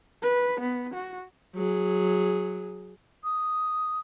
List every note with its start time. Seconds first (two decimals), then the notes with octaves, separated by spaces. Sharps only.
0.22 B4
0.60 B3
0.94 F#4
1.55 F#3 G#4
3.24 D#6